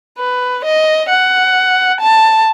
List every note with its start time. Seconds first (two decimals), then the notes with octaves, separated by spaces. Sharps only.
0.18 B4
0.64 D#5
1.09 F#5
2.01 A5